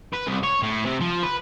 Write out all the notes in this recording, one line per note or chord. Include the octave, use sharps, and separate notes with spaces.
B4
C2
C#5
A2
C3
F3
B4